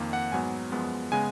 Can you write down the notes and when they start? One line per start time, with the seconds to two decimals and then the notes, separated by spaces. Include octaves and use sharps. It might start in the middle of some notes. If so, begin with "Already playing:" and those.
Already playing: F2 D#3 A#3
0.13 F#5
0.32 G#2 F#3 B3 G#5
0.72 F#2 F3 G#3 B3
1.12 C#3 G#3 B3 G#5